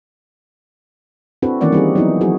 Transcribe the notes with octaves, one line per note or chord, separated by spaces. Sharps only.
C4 D4 E4 F#4 A4 B4
D#3 E3 A#3 C#4 D5 F#5
G3 C4 D#4 F4 G#4
F#3 B3 D#4 E4
F3 F#3 E4 F#4 G#4